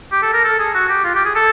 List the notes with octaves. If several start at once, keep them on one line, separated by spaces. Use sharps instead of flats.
G4
A4
A#4
A4
G#4
F#4
G4
F4
G4
G#4
A4